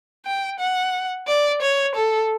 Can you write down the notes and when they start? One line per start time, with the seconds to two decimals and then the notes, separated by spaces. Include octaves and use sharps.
0.26 G5
0.60 F#5
1.28 D5
1.62 C#5
1.95 A4